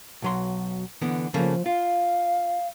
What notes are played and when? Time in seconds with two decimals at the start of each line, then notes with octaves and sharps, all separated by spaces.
0.22 B1 F#3 C6
1.02 D3 E3 B3
1.34 C#3 F3 A3 A#3
1.66 F4 F5